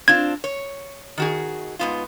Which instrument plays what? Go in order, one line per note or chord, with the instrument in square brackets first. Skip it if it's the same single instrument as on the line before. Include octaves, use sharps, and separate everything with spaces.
[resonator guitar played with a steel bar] C4 D4 F4 [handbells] G#6
[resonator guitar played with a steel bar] C#5
D#3 F#4 G#4
G#2 B3 F4